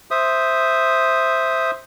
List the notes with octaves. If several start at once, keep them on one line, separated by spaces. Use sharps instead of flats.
C5 E5 D#6